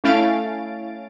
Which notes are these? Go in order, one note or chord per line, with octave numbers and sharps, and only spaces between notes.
A3 C#4 E4 F5 A6 D7